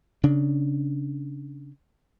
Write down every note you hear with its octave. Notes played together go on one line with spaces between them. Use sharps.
C#3 D4